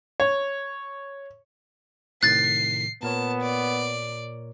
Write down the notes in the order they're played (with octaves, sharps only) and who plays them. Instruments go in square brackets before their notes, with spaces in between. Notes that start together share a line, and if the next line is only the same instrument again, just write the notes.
[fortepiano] C#5
[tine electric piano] A2 C3 D#3 [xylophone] F#6 A6 [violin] C7
[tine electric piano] A#2 A#4 C#5 [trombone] B3 [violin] A5
[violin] D5